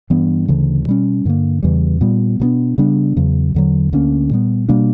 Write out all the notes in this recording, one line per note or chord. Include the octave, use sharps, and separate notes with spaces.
G2 E3 B3
D2 C#3 E3
B2 G3 C#4
G2 D3 A#3
E2 C#3 E3 G3
A#2 G3 B3
B2 F#3 B3 D4
C#3 G3 B3 D4
E2 C#3 F#3
E2 D3 F#3
D2 D3 A#3 C#4
A#2 G3 B3
B2 G3 A#3 D4